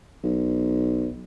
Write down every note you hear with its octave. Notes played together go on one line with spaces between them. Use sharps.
B1